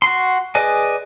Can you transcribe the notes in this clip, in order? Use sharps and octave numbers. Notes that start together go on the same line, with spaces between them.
F#4 C6
G#4 B4 D5 D#5 G#5